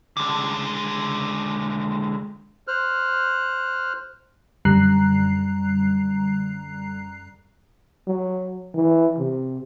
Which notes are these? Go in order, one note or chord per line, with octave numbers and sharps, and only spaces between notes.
D3 G#3
C5 F6 F#6
F#2 D3 G3 A#5 F#6 C7
F#3
E3
C3